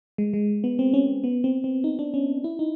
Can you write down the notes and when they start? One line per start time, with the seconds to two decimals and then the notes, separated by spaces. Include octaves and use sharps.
0.18 G#3
0.33 G#3
0.64 B3
0.79 C4
0.94 C#4
1.24 B3
1.44 C4
1.64 C4
1.84 D#4
1.99 D4
2.14 C#4
2.44 E4
2.59 D#4